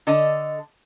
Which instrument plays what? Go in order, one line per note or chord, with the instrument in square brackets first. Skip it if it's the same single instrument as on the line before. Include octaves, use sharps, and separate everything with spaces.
[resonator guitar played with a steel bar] D3 A4 D#5